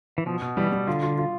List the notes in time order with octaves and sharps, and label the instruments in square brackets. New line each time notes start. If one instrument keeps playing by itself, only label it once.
[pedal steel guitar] E3
[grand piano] B2 [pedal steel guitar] F3
[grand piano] B2
[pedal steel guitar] E3 [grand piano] G3
[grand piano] G3
[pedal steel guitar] D3 [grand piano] F4
[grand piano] F4
F4